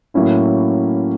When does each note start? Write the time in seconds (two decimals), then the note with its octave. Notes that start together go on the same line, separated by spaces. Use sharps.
0.14 A2 F#3 A#3 C#4 E4